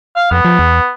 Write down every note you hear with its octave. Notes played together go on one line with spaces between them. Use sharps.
F5
F2 B3
F3
E2